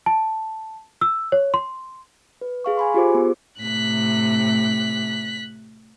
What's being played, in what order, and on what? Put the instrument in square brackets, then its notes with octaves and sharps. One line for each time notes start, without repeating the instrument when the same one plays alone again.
[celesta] A5
E6
C#5
C6
[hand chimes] B4
G#4 F5 C#6
G#5 B5 C6
F4 G4 G#4 C5 D6
B3
[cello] A2 C3 [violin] F#6 B6